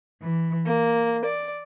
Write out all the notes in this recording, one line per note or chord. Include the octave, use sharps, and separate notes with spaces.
E3
A#3
D5